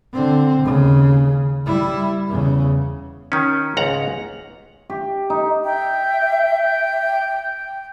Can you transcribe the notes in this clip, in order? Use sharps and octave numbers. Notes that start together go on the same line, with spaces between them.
D3 C4
D#2 C#3
G3 E4
E2 C#3
D#3 C#4
C#2 G#2 F#5 A#5
G4
D#4
E5 G5